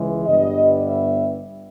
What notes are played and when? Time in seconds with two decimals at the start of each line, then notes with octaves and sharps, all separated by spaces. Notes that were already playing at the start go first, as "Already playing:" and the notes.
Already playing: C#2 C#3 E3 G#3
0.26 G1 G2 G3 B3 D#5
0.86 E5